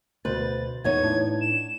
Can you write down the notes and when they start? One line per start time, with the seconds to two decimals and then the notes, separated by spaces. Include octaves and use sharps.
0.25 D2 B2 B4 C5 A6
0.84 E2 B3 D#4 C#5 G#6
1.03 A2 D4
1.41 E7